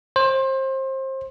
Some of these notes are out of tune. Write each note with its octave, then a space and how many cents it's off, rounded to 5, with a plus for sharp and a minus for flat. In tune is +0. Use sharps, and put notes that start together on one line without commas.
C5 +25